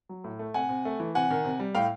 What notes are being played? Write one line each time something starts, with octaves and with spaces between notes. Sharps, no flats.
F#3
A2
A3
C3 F#5 G#5
C3
A3
E3
C3 F#5 G#5
D#3
C3
G3
A2 F5 G5